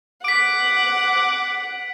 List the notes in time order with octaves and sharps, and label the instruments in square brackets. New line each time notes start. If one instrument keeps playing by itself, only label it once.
[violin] F#5 [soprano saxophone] D6 [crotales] B6 D7